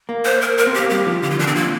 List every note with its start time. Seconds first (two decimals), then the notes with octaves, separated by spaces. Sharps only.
0.09 A#3
0.25 C5
0.41 A#4
0.58 A#4
0.67 C4
0.74 A#3 G4
0.90 G3 G4
1.06 F3
1.22 D3 G4
1.30 F4
1.39 D3 D4
1.47 C4
1.55 F3 A#3